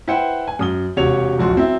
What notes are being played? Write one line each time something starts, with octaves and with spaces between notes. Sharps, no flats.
E4 B4 C5 F#5 G5
G#5
F#2 D#6 G7
E1 C3 F#4 C#5 F7
D1 A#1 F#4 C6
F#3 C4 E4